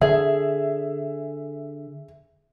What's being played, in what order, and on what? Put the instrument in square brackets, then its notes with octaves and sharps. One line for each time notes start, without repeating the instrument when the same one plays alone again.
[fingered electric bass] D3 [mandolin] G#4 [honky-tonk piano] E5